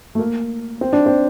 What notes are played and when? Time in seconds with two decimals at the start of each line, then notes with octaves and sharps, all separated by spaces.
0.15 A3
0.19 A#3
0.81 C4
0.93 D4
1.06 C4